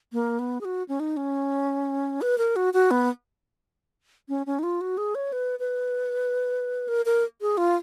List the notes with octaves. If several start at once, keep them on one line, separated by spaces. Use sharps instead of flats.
A#3
B3
G#4
F#4
C#4
D#4
C#4
B4
A#4
F#4
F#4
B3
C#4
C#4
D#4
F4
F#4
G#4
C#5
B4
B4
A#4
A#4
G#4
F4